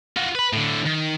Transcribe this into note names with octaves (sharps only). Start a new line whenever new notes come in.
F4 F#4
B4 B5
A2 D3
D#3